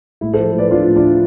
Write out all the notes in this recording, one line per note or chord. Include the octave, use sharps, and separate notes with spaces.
A2 E4
F3 A4 C5
A2 B4 D5
F3 D4 F4
A2
D4 F4
F3